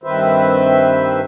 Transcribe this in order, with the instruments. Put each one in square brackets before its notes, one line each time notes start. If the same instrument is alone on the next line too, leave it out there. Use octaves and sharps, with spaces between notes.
[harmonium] G2 D#3 C4 B4 C5 E5